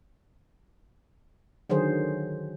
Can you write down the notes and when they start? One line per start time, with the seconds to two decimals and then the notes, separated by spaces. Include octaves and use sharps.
1.69 D3 D#3 F#3 G#4 C5